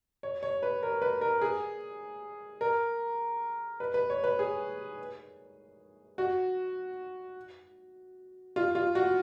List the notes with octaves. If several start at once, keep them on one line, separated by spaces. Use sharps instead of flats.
C#5
C#5
B4
A#4
B4
A#4
G#4
A#4
B4
B4
C#5
B4
G#4
F#4
F4
F4
F#4